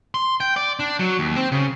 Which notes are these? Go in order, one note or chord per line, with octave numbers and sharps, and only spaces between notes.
C6
G5
D5
D4
F#3
D#2
C4
C#3